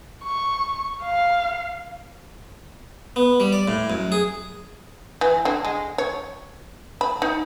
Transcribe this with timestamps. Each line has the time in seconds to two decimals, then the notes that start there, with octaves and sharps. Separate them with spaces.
0.23 C#6
1.03 F5
3.16 B3
3.40 G3
3.53 D5
3.68 A2
3.90 F#2
4.12 G#4
5.21 E3
5.45 D3
5.65 G#3
5.98 C#5
7.01 B5
7.22 D#4